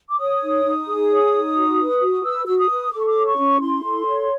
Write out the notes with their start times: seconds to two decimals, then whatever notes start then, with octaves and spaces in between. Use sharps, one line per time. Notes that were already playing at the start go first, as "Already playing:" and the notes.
0.10 D6
0.19 C#5 D#6
0.42 D#4
0.64 D#4
0.88 G#4
1.10 C#5
1.33 D#4
1.55 F#4
1.79 B4
2.01 F#4
2.24 B4 E6
2.46 F#4 E6
2.58 D#6
2.69 B4
2.92 A4 D6
3.00 C#6
3.06 D6
3.15 C#5
3.26 C#6
3.38 C#4
3.60 E4 C6
3.84 A4
4.06 C#5